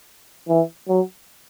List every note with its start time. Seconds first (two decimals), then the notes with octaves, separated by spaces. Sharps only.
0.49 E3
0.88 F#3